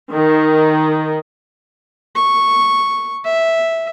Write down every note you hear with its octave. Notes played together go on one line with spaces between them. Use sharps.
D#3
C#6
E5